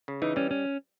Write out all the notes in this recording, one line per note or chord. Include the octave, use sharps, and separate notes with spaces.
C#3
E3 D#4
G3 C#4
C#4